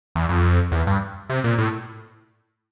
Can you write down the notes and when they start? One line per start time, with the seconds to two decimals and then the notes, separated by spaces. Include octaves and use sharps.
0.15 E2
0.29 F2
0.72 E2
0.87 G2
1.30 C3
1.44 A#2
1.58 A2